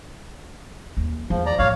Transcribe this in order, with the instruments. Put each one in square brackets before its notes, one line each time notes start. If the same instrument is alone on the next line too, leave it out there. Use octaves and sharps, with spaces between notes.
[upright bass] D#2
[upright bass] E2 [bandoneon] F3
[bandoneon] D5 A#5
[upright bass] F2 A2 [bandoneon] C#5 F5